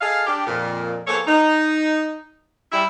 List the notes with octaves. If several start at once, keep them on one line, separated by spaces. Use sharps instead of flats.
G#4 A4 D#5 F5
D4 G4
F2 A#2
F3 A#3 B3 G#4 A4 C#5
D#4
G3 E4